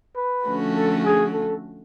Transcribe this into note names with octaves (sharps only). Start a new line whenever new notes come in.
B4
D3 F3 A3 C#4 F#4
A4
G#4
A4